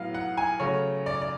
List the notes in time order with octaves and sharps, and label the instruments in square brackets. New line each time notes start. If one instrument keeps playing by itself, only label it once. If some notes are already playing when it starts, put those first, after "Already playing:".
Already playing: [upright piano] A2 F#3 B3 F5
F#5
G#5
C#3 F#3 A3 C#5
D5
D5